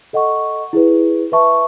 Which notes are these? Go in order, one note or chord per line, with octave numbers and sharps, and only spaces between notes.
A4 D#5 F#5 C#6
E4 G#4 B4
B4 E5 A5 C#6